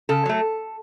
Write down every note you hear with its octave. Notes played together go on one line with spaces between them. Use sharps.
C#3 A4
F#3 A3